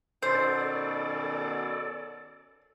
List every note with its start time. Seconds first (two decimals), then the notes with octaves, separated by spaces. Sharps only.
0.22 B2 D#3 C#4 A4 C5 D5